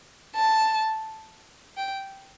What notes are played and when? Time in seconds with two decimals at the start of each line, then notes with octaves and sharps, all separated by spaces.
0.36 A5
1.77 G5